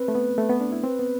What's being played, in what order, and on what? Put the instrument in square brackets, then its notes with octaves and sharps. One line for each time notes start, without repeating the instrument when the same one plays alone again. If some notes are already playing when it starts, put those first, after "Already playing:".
Already playing: [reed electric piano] C4 [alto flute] B4
[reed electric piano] A3
B3
A3
B3
D4
E4
[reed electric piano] C4 [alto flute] B4
[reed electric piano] B3